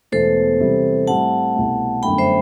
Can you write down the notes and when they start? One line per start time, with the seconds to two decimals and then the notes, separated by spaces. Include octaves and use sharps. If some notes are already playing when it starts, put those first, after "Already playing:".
0.12 E1 E2 B2 A3 A4 C5
0.60 E2 C3 G3 C4
1.07 A2 G3 C4 E4 F#5 A5
1.55 C2 B2 A3
2.02 G1 F#2 D3 A3 D4 G5 B5
2.18 C5 E5